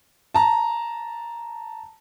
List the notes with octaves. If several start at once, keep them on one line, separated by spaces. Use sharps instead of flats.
A5 A#5